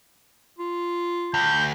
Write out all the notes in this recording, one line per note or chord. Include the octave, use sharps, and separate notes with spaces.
F4
D2 G6